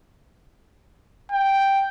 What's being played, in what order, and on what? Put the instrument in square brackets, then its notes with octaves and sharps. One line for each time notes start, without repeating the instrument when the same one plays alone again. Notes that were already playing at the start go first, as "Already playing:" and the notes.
[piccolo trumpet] G5